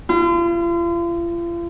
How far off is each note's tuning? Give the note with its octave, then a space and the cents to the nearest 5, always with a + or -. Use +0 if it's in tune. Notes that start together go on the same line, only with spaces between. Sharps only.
F4 -40